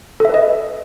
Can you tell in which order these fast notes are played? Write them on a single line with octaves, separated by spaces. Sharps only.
A4 E5 B4 D#5